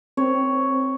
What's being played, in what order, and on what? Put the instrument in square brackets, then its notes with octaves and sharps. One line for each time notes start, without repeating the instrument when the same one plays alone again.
[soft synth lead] C4 [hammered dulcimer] C#5